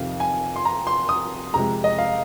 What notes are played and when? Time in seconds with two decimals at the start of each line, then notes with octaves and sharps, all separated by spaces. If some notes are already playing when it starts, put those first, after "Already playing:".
Already playing: F2 C3 D#3 F5
0.20 G#5
0.56 C6
0.65 A#5
0.87 C6
1.09 D#6
1.54 F2 C3 G#3 A#5
1.84 D#5
1.98 F5